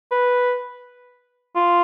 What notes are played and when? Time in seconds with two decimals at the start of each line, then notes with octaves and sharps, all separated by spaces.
0.11 B4
1.56 F4